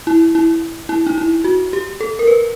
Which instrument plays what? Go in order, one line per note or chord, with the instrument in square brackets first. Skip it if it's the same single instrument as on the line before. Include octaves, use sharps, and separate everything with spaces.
[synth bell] E4
E4
E4
D#4
E4
F#4
G4
A4
A#4
B4